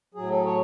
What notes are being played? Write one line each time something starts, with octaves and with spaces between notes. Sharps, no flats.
A2 F#3 G#4
A4
C#5